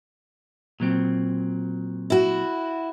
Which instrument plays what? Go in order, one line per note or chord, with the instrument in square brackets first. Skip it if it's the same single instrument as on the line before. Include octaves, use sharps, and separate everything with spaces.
[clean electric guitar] A#2 F#3 C4
[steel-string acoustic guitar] E4 F#4